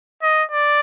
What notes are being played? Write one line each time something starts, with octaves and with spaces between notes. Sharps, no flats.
D#5
D5